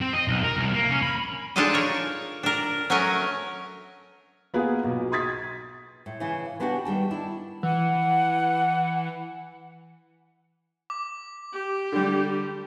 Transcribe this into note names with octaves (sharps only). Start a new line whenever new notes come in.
C4
D#5
B1
A#4
C2
A#3
C#4
B5
G#3 D4 D#4 F4 A4 D#5
A#4 C#5
D4 A#4
F#3 A3 C#4 A#4 C#5 D#5
A#3 B3 F4 G#4
B1
C6 D#6 G#6 A6 B6
A2
C#3 E3 E4
B3 D4 F#4 G4 F5 G5
D#3 G3 G5 A5
D4 E4
E3 F#5
D6
G4
D3 G3